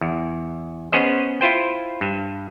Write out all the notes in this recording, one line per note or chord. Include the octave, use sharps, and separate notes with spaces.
E2
B3 C#4 G#4 C5 D#5
E4 F4 C5 G5
G2